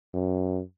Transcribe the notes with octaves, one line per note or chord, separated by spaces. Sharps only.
F#2